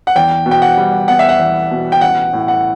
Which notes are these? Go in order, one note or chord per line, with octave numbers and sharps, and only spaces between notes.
F#5
E2 G5
B2
G5
F#5
G3
B3 F#5
E5
F#5
E2
B2
G5
A1 F#5
A2
F#5